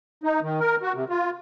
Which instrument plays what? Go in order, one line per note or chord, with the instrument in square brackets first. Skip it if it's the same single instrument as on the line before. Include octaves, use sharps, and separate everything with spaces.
[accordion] D#4
D#3
A#4
F#4
C3
F4